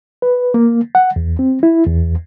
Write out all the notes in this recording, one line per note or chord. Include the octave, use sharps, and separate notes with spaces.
B4
A#3
F#5
E2
C4
E4
E2